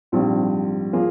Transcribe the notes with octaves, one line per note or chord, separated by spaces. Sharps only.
A#1 G#2 G3 C4 F4
F3 A#3 F4 G#4